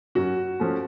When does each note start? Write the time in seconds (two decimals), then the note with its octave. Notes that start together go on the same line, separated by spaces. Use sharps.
0.15 F#2 F#4
0.60 F3 A3 C#4